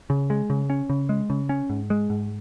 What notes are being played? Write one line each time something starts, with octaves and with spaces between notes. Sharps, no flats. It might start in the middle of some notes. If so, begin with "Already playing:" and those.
C#3
G#3
C#3
C#4
C#3
G#3
C#3
C#4
G#2
G#3
G#2